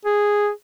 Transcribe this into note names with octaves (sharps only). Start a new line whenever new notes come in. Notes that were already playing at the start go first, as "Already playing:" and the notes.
G#4